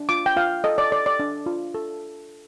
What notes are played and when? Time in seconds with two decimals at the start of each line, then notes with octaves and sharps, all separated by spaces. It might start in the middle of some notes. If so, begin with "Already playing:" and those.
Already playing: D4
0.09 F4 D6
0.26 G5
0.36 F4 F5
0.64 A4 D#5
0.78 D5
0.91 A4 D5
1.06 D5
1.20 D4
1.46 F4
1.75 A4